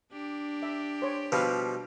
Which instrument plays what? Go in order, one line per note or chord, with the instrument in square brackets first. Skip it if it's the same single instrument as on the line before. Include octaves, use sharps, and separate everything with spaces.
[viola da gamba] D4 G4
[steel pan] E5
C5 C#5
[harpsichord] B2 F3 G3 [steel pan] B4 F5